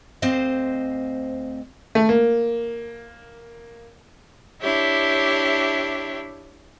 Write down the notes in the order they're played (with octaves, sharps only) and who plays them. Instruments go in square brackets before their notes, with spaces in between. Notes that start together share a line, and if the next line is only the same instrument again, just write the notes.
[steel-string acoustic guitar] D2 C4 C5 D#5 F5
[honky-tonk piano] A3
A#3
[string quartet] D4 E4 G4 C#5 E5